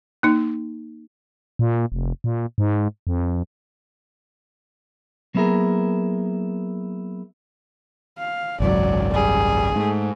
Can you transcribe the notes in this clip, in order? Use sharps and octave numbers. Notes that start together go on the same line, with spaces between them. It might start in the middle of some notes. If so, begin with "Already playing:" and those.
A#3 D#4
A#2
F1
A#2
G#2
F2
F#3 A#3 B3 E4 G#4 A#4
F5
G#1 C#2 F#2 F#3 D5
G3 G#4
G#2 A3